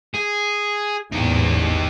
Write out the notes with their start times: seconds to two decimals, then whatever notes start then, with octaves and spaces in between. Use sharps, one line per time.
0.15 G#4
1.12 A1 E2 G#2 D#4 G4